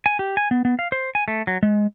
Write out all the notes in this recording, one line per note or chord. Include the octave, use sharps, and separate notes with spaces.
G#5
G4
G#5
B3
B3
F5
C5
G#5
A3
F#3
G#3